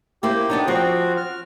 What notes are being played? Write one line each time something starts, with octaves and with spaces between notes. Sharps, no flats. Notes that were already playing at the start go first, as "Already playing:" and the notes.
A#3 E4 G4 C5
B3 D4 D#4
F3 C4 F#4
F6